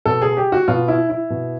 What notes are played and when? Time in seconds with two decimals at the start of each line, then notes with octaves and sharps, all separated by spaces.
0.06 B2 A4
0.22 G#4
0.37 G4
0.52 F#4
0.68 B2 F4
0.88 E4
1.10 E4
1.30 B2